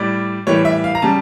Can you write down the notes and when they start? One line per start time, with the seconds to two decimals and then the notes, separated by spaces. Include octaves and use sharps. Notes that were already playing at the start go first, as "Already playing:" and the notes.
Already playing: A2 G3 D5
0.47 A2 E3 G3 C#5
0.65 E5
0.84 F5
0.95 A#5
1.02 C#3 G3 A5